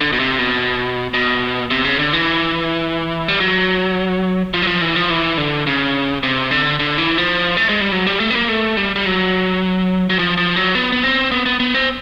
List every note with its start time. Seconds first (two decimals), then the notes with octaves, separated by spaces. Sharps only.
0.01 D3
0.12 B2
0.20 C3
0.39 B2
1.14 B2
1.71 C3
1.84 C#3
1.99 D3
2.13 E3
3.28 G3
3.40 F#3
4.54 F3
4.62 F#3
4.67 F3
4.81 E3
4.96 F3
5.10 E3
5.38 D3
5.67 C#3
6.23 C3
6.51 D3
6.79 D3
6.98 E3
7.18 F3
7.57 A3
7.69 G#3
7.81 G3
7.92 F#3
8.06 G3
8.20 A3
8.30 B3
8.35 A#3
8.48 A3
8.77 G3
8.96 G3
9.06 F#3
10.10 F#3
10.19 F3
10.37 F3
10.56 F#3
10.75 B3
10.92 B3
11.04 C4
11.32 B3
11.46 B3
11.60 B3
11.74 C4